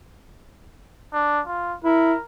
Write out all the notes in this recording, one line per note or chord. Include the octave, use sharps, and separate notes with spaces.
D4
F4
E4 A#4